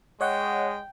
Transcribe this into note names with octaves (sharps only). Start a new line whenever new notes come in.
G#3 C#5 D#5 F#5 G5